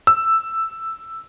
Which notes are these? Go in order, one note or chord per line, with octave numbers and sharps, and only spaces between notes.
E6